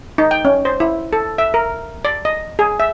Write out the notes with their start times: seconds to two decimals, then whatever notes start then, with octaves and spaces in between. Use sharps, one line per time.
0.18 D#4
0.31 G5
0.45 C#4
0.65 C5
0.80 E4
1.13 A4
1.38 E5
1.54 A#4
2.05 D5
2.25 D#5
2.59 G#4
2.80 E5